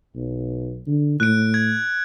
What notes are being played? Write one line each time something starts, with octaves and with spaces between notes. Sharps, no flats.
B1
D3
A2 F#6 D7
G#6